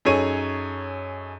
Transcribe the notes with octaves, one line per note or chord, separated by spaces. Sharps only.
F#2 D#4 G#4 A4 C#5 D#7